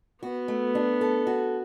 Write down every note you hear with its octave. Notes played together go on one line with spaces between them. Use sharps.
B3 F#4
A3
D4
A4
F#4